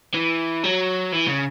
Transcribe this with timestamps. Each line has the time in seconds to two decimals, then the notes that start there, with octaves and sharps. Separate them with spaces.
0.15 E3
0.64 F#3
1.12 E3
1.28 C#3